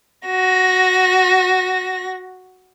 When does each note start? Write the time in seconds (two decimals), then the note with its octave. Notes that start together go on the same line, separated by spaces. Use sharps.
0.28 F#4 A#6